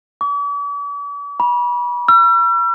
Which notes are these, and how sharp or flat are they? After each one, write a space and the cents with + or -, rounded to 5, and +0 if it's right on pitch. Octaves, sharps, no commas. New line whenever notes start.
D6 -45
B5 -35
E6 +45